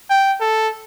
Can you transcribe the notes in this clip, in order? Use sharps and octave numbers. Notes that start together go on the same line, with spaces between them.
G5
A4